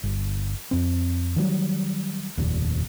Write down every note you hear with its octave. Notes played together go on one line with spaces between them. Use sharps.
G1
F2 C4
D#3 F#3 G3
F1 D#2 A#2